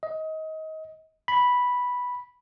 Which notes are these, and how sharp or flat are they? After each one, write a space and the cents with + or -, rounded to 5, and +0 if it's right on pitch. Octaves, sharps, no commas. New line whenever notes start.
D#5 +25
B5 -5